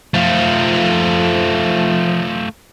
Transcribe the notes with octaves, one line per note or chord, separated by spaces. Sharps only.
F3 A3 F4